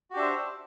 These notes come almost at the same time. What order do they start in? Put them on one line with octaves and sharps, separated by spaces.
F#4 G4 D4 E5 C5